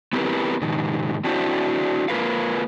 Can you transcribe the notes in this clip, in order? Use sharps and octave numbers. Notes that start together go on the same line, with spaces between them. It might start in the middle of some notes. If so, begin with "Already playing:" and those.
B3 C4 E4 G4 A#4 B4
G#2 B2 D#3
C4 D4 E4 F#4 C5 E5
A#3 F4 A#4 B4 E5 F5